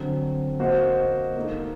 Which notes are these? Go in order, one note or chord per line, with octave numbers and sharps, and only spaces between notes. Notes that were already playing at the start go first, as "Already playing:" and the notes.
Already playing: D3 F#3 C4
A#3 F#4 C5 D#5
A#3 D#4 A4